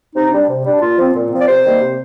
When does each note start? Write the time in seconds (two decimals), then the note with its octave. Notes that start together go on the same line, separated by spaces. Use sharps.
0.15 C3 D#4
0.32 G3 D4
0.48 C3
0.65 G3 D4
0.81 A#2 F4
0.98 F3 C4
1.14 A#2
1.30 F3 C4
1.40 D5
1.47 C3 C5
1.63 D#3 G3 A#3
1.80 C3